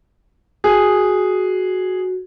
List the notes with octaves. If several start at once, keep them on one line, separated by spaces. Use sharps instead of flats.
F#4 G#4